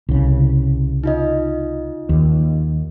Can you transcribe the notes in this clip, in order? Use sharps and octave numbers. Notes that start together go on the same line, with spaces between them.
C2 C#3
D#4 F4 D#5
D#2